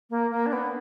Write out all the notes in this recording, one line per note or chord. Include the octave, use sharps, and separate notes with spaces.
A#3
A#3
D4
B3